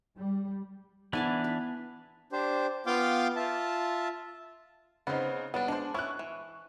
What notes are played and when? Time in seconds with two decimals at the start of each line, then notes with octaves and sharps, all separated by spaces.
0.17 G3
1.13 E3 B3 D4 E4 G#5 A5
1.44 B4
2.32 D4 G4 C5
2.86 B3 F4 F5 G5 C6 D6
3.36 F4 E5 A5
5.07 C#3 B3 C4 D#4 C5
5.54 F#3 G3 B3 D4
5.68 G#3 D4 C5
5.94 C#4 E4 C#6 F#6
6.19 E3